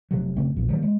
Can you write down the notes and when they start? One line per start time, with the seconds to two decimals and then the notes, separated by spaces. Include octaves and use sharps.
0.11 F1 C3 F#3
0.37 F#2 C#3 A3 C4
0.56 B1 F2 A#2
0.69 D#3 F#3 G3 A#3
0.82 G#3